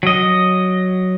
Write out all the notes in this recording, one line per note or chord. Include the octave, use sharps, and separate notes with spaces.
F#3 D#5